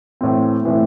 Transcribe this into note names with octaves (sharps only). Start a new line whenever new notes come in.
A2 E3 C4
A2 E3 C4